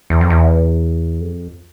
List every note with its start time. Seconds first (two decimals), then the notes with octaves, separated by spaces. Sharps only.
0.10 E2
0.21 F2
0.30 E2
1.20 F2